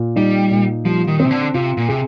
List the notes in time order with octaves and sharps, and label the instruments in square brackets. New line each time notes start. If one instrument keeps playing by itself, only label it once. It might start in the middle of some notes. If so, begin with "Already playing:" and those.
Already playing: [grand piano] A#2
[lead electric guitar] G3 [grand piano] D#4
[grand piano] A#2
[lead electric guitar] F3 [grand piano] G3
[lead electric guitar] D#3
[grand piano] C4
[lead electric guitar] C3
D3
[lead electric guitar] C3 [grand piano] F4
[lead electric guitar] A#2
[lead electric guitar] C3 [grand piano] G#4